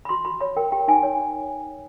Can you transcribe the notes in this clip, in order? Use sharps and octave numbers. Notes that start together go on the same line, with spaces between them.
B5
F#4 C6
F#4 B5
C#5 B5
A#4 G5
G4 G5
D#4 G#5
C#5